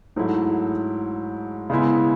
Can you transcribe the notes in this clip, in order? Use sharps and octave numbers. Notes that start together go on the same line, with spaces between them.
G#2 F#3 A3 E4
C#3 G#3 B3 E4